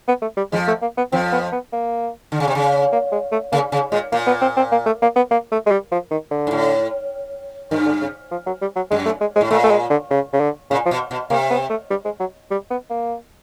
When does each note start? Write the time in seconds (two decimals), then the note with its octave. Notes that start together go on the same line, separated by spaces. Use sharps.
0.08 B3
0.22 A3
0.37 G3
0.52 F2 F3 G#3
0.68 A3
0.82 A#3
0.98 B3
1.12 F2 F3 C4
1.32 B3
1.52 B3
1.73 A#3
2.32 D3
2.40 C#3
2.48 C3
2.55 C#3
2.93 A#3
3.12 G#3
3.32 A3
3.52 C#3 A#3
3.72 C#3
3.92 A#2 G#3
4.12 A#2 A#3
4.27 B3
4.42 C4
4.57 C4
4.72 A#3
4.86 A3
5.02 A#3
5.16 B3
5.31 A#3
5.52 A3
5.66 G#3
5.71 G3
5.92 F3
6.11 D#3
6.31 D3
6.47 G#2
6.51 A2
7.71 G2 D#3
7.86 D3
8.01 C#3
8.31 F3
8.47 F#3
8.61 G3
8.76 F#3
8.91 F#2 G#3
9.06 A3
9.21 G#3
9.36 G#3
9.41 A2
9.51 A#2 A3
9.64 A3
9.71 G#3
9.90 D3
10.11 C#3
10.33 C#3
10.40 D3
10.70 A#2 C#3
10.86 F3
10.91 B2
11.11 B2
11.30 C3 A#3
11.50 B3
11.70 A3
11.91 G3
12.05 G#3
12.20 F#3
12.51 G3
12.71 B3
12.90 A#3